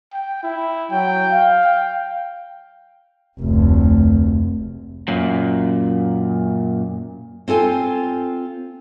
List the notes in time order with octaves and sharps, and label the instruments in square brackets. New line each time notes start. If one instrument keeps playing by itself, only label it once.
[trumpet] G5
E4
[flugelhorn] F#3 [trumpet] G5
[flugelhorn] F5
[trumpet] G5
[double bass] F1 D2
[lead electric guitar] F#2 A#2
[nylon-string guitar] C4 F4 A4 G#5